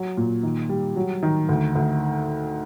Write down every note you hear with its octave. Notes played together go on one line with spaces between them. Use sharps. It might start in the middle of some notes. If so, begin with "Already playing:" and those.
Already playing: F#3
A#2
D#3
G3
F#3
D#3
D2
D2